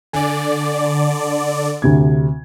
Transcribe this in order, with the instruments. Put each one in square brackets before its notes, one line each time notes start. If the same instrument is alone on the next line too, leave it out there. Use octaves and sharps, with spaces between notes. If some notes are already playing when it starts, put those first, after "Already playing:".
[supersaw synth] D3 D5 [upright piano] G#5
[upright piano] D2 C3 G#6